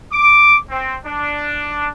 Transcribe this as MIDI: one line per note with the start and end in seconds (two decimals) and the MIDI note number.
0.12 0.57 86
0.70 0.96 60
1.06 1.88 62